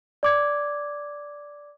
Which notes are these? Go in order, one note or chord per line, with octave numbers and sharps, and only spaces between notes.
D5 D6 G#6